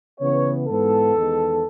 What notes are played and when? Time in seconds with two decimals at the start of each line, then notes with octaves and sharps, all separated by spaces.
0.20 C#3 E3 B3 C#5
0.68 G#2 E3 B3 A4
1.15 E2 D#3 G#3 B3